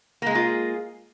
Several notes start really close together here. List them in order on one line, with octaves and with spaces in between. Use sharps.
A#3 G#3 G#4 F4